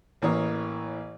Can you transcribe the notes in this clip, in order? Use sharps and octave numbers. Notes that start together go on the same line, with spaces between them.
A1 E3 A#3 C#5 D#6